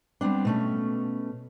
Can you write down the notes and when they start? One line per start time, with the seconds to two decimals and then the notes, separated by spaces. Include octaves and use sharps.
0.21 G3 B3 C4 D4
0.45 B2 A3 C#4